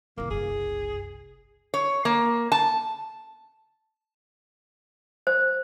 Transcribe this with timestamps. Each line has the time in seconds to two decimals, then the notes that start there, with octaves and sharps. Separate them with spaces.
0.18 C2 D#3 A#3
0.30 F#1 C2 G#4
1.74 C#5
2.05 A#3
2.52 A5
5.27 C5